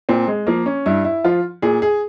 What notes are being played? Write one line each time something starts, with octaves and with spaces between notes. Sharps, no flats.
A#2 C4
G#3
F3 A#3
C#4
G2 E4
E4
F3 F4
A#2 G#4
G#4